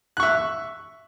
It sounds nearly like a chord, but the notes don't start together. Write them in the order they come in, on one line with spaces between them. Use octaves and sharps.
F#6 C#6 E5